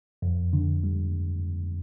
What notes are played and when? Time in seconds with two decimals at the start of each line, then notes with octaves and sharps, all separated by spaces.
0.22 F2
0.53 D3
0.84 G3